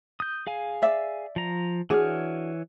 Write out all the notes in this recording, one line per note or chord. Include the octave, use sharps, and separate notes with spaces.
D#6 G6
G#4 F5 G#5
D5 E5
F3 A#5
E3 D4 F#4 G#4 C#5 F6